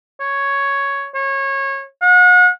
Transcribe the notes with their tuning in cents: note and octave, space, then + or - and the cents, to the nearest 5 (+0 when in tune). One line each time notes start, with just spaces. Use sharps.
C#5 +5
C#5 -25
F#5 -40